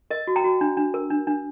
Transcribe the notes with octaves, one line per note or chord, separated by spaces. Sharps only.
A#4 D#5
F#4
G5 A#5
F#4
D4
D4
A#4
D4
D4